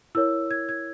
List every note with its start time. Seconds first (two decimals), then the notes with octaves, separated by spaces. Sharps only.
0.15 E4 A#4 C#5 E6
0.51 G#6
0.69 G#6